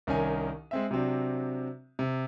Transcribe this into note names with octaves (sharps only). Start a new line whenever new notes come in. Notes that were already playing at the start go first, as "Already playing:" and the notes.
C2 D#3 C#4 D#4 G#5
G#3 C4 E5
C3 F#3 C4 D4
C3